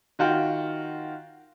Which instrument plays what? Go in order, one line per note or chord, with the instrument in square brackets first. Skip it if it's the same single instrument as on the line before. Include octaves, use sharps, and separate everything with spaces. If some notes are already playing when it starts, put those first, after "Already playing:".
[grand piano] D#3 F4 F#4 G5 G6